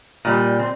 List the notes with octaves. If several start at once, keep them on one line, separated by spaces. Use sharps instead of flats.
A#2 G3
C4